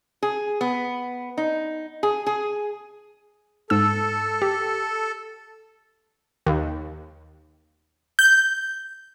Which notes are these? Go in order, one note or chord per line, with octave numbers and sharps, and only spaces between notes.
G#4
B3
D#4
G#4
G#4
G#2 A4 E6
G4
D#2
G6